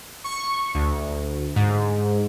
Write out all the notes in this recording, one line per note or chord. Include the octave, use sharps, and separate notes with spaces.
C#6
D2
G#2